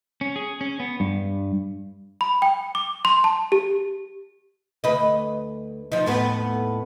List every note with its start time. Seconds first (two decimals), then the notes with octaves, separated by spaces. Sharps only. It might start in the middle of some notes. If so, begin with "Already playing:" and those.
0.21 C#4
0.36 G#4
0.61 C#4
0.80 B3
1.00 G2
2.21 B5
2.42 G5
2.75 D6
3.05 C6
3.24 A5
3.52 G4
4.84 D2 B4 D#5
5.92 F3 D#4
6.06 D#2 A2 B3